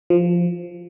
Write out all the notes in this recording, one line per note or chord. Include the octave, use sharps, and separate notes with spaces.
F3